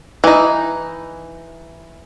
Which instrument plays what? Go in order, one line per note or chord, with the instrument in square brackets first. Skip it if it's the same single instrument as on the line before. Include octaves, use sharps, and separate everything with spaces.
[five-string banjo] E3 D#4